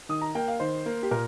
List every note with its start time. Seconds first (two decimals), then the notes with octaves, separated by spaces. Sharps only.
0.09 D#3 D#6
0.21 A#5
0.35 A#3 G5
0.48 F5
0.60 D#3 C5
0.86 A#3
1.03 G4
1.11 A#2 A#4